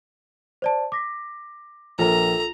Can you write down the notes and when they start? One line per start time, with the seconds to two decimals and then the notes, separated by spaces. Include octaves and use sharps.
0.62 C5 D5 A5
0.92 D6 A#6 B6
1.99 A#1 F4 A4 A#4 A#5